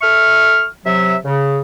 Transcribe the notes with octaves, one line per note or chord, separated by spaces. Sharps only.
A4 E5 C#6 F6
C3 F#3 E5
C#3